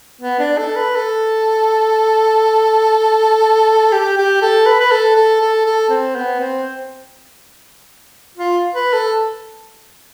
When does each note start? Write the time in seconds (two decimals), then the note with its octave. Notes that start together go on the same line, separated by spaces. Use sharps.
0.21 B3
0.39 D4
0.58 A4
0.76 B4
0.95 A4
3.92 G4
4.17 G4
4.42 A4
4.66 B4
4.80 B4
4.92 A4
5.15 A4
5.41 A4
5.66 A4
5.90 C4
6.15 B3
6.39 C4
8.37 F4
8.75 B4
8.93 A4